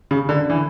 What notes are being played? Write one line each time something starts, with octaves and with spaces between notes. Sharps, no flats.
C#3
D3
E3